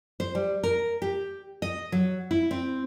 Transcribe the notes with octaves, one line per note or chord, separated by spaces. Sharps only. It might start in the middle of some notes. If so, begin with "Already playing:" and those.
C5
G3
A#4
G4
D#5
F#3
E4
C4